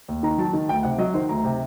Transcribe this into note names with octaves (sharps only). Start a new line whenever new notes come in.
D#2
D#3 A#5
F#3 A5
D#3
D2 G5
C3 F#5
F#3 D#5
D#3 C5
D2 A#5
C3